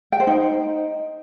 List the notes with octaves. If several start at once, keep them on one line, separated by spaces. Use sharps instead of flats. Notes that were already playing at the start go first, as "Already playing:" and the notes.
G5
C5
D#4